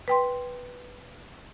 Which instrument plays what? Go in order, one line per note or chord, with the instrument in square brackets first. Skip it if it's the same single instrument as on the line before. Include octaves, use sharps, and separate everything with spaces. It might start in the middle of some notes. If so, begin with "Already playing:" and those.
[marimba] B4 G5 C6